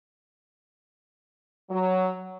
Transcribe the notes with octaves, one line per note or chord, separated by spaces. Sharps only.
F#3